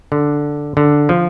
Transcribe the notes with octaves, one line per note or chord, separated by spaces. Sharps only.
D3
D3
F3